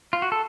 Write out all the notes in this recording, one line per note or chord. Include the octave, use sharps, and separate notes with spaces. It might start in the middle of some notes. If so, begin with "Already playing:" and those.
F4
F#4
A4